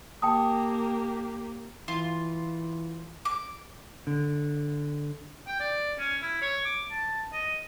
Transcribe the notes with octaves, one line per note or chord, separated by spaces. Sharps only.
A#3 G4 G5 A5 D#6
E3 F4
D6
D3
G5
D5
C#4
E4
C#5
D6
A5
D#5